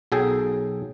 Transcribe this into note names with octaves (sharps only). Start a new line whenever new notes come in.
B1 F#3 G#4 A4 G5